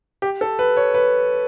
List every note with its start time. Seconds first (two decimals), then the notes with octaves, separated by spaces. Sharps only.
0.22 G4
0.41 A4
0.59 B4
0.77 C#5
0.94 B4